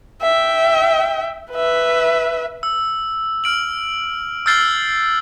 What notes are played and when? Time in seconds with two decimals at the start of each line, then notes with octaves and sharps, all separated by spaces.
0.22 E5 G5
1.52 B4 E5
2.63 E6
3.44 F6 D7 F#7
4.46 E6 F6 G6 A6 C7 G7